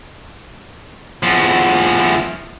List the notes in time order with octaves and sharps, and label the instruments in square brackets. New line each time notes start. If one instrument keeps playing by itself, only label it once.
[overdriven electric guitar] E2 F3